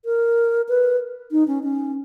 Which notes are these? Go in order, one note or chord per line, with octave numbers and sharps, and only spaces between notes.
A#4
B4
D#4
C#4
C#4